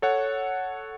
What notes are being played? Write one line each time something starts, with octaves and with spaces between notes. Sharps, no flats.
A4 C#5 F#5